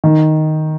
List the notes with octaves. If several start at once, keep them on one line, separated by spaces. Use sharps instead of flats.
D#3